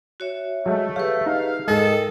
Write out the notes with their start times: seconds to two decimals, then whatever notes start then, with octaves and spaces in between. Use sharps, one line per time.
0.20 F#4 C#5 E5
0.66 F#3 G#3 A3
0.96 G4 G#4 B4 C#5 F5
1.26 D#4 F5
1.68 G#2 G#3 A4 A#4 D#5 G5